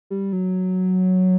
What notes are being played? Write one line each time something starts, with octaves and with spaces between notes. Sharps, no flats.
G3
F#3